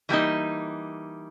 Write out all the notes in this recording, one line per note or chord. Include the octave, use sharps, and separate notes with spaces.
E3 G3 A#3 D#4